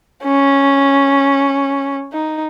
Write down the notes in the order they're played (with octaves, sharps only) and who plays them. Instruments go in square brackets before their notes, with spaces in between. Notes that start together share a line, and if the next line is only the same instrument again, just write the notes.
[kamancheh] C#4
D#4